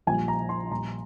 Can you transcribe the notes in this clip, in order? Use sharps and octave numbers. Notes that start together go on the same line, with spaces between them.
A#1 A#2 G3 G#5
A#5
C6
A#1 A#2 G3 A#5